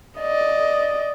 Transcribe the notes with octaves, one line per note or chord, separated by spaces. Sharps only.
D5 D#5